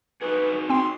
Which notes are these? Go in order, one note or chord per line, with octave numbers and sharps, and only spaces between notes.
D#4 F#4 G#4 B4
C4 G5 C6